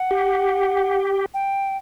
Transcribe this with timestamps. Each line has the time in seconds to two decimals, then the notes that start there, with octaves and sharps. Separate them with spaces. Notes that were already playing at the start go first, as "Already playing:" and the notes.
Already playing: F#5
0.11 G4
1.34 G5